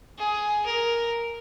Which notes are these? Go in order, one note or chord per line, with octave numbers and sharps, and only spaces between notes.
G#4
A#4